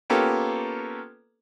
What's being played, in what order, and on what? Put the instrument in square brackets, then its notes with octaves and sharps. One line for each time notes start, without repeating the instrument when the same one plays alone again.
[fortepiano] A#3 B3 C#4 F4 G4 A4